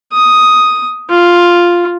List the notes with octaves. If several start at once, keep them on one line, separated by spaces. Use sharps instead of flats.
D#6
F4